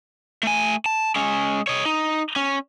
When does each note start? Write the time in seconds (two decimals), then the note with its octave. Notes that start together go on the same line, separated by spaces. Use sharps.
0.43 A3 G#5
0.86 A5
1.16 G#3 C#4
1.67 C#5 D#5
1.85 D#4
2.36 C#4